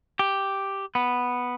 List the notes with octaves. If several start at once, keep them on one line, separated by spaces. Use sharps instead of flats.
G4
B3